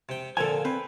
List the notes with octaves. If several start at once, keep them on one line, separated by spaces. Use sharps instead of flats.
C3 G5
A#2 D3 F3 A4 G#5
C4 B4